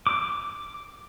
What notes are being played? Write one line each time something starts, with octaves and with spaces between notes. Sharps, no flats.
D6